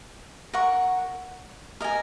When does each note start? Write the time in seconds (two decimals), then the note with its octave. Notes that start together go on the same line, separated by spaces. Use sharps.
0.53 A#4 F#5 C#6
1.81 A#4 D#5 G#5